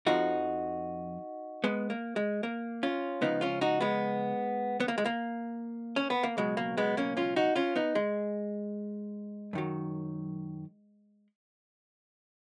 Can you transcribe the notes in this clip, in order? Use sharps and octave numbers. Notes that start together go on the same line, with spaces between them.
F2 F3 D#4 F#4
G#3 B3
A#3
G#3
A#3
C#4 F4
C#2 C#3 F3 B3 D#4
C#4 F4
D#4 F#4
G#3 B3
B3
A#3
G#3
A#3
C#4
B3
A#3
C#2 B2 F#3 G#3
A#3
G#3 B3
A#3 C#4
C#4 F4
D#4 F#4
C#4 F4
B3 D#4
G#3
F#2 D#3 F#3